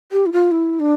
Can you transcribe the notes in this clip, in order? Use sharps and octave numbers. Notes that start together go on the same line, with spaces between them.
G4
E4
F4
E4
D4